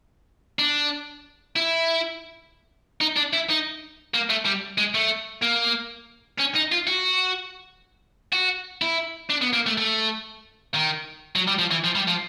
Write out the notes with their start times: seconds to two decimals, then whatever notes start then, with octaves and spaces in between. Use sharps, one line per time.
0.59 D4
1.56 E4
3.01 D#4
3.16 D4
3.33 E4
3.49 D#4
4.14 A#3
4.30 A3
4.45 G3
4.78 G#3
4.95 A3
5.43 A#3
6.40 C#4
6.55 D#4
6.72 F4
6.87 F#4
8.33 F#4
8.82 E4
9.30 D4
9.42 B3
9.53 A#3
9.66 A3
9.78 A3
10.74 D#3
11.36 F#3
11.48 G3
11.59 F3
11.71 E3
11.84 F3
11.95 G3
12.08 F3